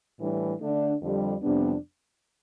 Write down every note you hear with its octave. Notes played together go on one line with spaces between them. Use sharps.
A2 E3 G3 D4
D3 A3 D4
F2 D3 G3
F2 C3 G3 B3 D4